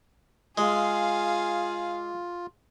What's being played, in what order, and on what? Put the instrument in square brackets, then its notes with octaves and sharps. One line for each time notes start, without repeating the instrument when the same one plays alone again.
[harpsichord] G#3 [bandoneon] F4 [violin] G#4 F5